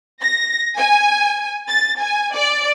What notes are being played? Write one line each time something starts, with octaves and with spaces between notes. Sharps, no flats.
A#6
G#5
A6
G#5
D5